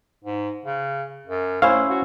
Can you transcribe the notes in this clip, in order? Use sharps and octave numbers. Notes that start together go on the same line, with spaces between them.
G#2
C#3
F#2
D2 C#4 E4 C5 F5
F#4